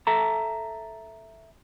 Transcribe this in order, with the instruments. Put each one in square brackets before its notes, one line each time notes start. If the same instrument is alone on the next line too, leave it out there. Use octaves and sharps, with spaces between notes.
[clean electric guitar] A4 E5 A5 A#5